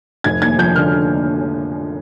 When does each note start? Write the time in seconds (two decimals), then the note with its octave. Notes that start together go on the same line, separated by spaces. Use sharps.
0.24 F1 G#6
0.42 D#2 G#6
0.59 F3 G6
0.76 D3 F6